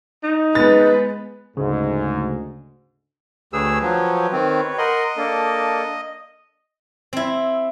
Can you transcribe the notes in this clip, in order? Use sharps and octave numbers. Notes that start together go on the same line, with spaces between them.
D#4
G#3 B3 B4 A6
D2 G#2 C#3
D2 G4 G#4 B4 C#5 E6
F3 F#3
D#3 C4
A#4 D#5 F#5 C6
A#3 D4 A4
C4 E4